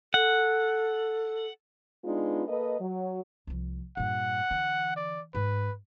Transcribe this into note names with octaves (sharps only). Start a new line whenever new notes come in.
A4 F#5
G#3 B3 D4 D#4 F4
A#3 A4 B4 D#5
F#3
C2 F3
G2 A#2 F#5
D3 E3
D5
G#2 B4